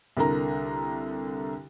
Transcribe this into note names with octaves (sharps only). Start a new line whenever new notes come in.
C2 D3 A#4 A#5